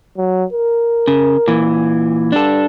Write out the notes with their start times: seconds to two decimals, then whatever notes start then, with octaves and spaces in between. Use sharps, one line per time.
0.17 F#3
0.53 A#4
1.08 C#3
1.48 A#2 E3
2.32 G2 D4 A4